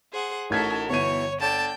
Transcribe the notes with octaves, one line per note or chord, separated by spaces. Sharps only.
G#4 C5 F#5
A1 C#4 D#4 F#4 A4 A#4 G#6 B6
G1 B2 E3 C#5 C#6 D#7
D3 A4 D5 G5 A5